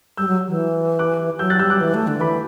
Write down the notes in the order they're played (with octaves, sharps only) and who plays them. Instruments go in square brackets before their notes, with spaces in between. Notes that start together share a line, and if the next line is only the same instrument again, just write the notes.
[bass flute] G3 [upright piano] E6 G6
[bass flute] F#3
E3
[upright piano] D6 F#6
[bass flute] F#3 [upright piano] E6 G6
[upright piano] F#6 A6
[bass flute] G3 [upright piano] E6 G6
[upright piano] D6 F#6
[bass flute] E3
A3
D3
[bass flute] E3 [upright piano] B5 D6